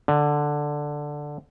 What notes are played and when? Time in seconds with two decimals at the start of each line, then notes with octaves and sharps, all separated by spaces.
0.08 D3